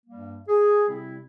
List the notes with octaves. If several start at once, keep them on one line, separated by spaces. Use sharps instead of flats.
G2 G3 A#3
G#4
C3 G3 C4 E4